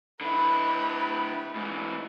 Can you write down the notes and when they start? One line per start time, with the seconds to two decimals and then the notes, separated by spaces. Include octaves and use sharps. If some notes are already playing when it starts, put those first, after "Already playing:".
0.21 D3 E4 B4
1.56 G#2 E3